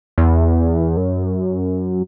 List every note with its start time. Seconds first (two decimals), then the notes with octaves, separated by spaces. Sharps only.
0.18 E2
0.97 F#2